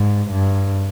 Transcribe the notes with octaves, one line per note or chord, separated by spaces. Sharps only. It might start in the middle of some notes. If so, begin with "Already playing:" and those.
Already playing: G#2
G2